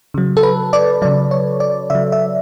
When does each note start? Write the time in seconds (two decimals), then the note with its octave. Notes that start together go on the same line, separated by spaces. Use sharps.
0.14 C#3 F#3
0.37 A4
0.43 B4
0.73 D5
1.02 C#3 F#3 D5
1.31 C#5
1.60 D5
1.90 C#3 F#3 E5
2.12 E5